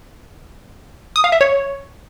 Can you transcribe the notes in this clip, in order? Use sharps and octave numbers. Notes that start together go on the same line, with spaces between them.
D#6
F5
E5
C#5